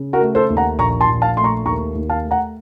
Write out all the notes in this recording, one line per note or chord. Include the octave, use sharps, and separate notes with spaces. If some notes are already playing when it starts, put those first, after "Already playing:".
Already playing: C#3
F#4 A#4
A3
A4 C5
D#2
F#5 A#5
A#1 A#5 C#6
A5 C6
A#1
F5 A5
A3 C6
A#5 C#6
D#2 A#5 C#6
D#2
F5 A5
A3
F#5 A#5